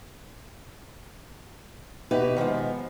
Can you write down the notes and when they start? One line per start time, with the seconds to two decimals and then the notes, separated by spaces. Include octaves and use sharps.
2.11 B2 D#4 G4 B4 E5
2.36 D#3 F3 G#3 B3